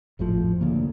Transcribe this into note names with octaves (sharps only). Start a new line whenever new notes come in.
G#1 F2 A2 F3
D2 C#3 A#3